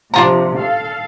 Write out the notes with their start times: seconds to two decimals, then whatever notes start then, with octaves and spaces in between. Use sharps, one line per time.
0.14 C3 F3 D4 F4 A#5
0.56 A4 F5